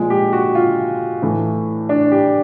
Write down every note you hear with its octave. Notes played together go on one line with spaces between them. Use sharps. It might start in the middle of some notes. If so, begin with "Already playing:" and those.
Already playing: A#2 F3 G#3
G4
F#4
F4
A2 E3 A3
D4
G4